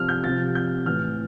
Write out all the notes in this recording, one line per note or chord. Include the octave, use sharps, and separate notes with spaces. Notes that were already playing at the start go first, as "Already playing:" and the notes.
Already playing: C3 F3 F6
G6
C3 F3 A6
G6
A2 E3 F6